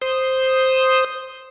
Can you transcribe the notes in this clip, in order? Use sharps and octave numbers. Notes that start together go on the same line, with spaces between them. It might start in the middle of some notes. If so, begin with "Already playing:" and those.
C5 D#6